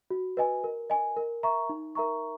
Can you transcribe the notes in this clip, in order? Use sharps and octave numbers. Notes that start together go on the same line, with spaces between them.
F#4
B4 D#5 G#5
A#4
D#5 G#5
A#4
E5 A#5 C#6
D#4
A#4 E5 A#5 C#6